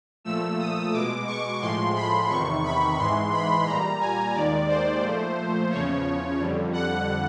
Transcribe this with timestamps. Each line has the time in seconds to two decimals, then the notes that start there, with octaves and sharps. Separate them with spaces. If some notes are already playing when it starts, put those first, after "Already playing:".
0.25 A#2 F3 A3 E6
0.59 D#6
0.93 B2 G#3 D6
1.27 C#6
1.61 A2 F3 G#3 C6
1.95 B5
2.29 E2 C3 D#3 C#6
2.64 B5
2.98 G#2 E3 G#3 C6
3.32 B5
3.66 A#2 G3 A#5
4.00 G#5
4.34 D#2 D#3 G#3 D5
4.68 C5
5.02 A#2 F3 A3
5.71 E2 C#3 F3 C#5
6.39 F2 D3 G3
6.73 F#5